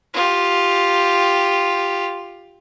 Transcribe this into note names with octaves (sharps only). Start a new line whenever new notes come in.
F4 G4